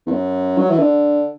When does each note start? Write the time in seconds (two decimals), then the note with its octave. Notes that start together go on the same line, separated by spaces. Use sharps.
0.06 E2
0.11 F#2
0.58 F#3
0.69 E3
0.79 D3